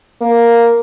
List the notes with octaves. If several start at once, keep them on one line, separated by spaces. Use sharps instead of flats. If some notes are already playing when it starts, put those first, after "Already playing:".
A#3